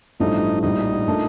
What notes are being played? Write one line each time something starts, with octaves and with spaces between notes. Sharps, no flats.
A1 G2 F3 A3 D#4
A#1 A2 G3 D#4
A#2 A3 D4 A4